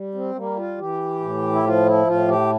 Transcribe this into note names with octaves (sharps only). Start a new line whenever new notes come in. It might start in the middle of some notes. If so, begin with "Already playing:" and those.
Already playing: G3
C4
G3 A#3
F4
E3 G4
A2
E4
F3 F4
E4
A2 F4
G4